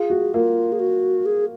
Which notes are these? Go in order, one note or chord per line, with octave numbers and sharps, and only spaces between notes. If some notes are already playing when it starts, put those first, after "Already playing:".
Already playing: F4 G#4
F#4
A#3 F4
G#4
F#4
G#4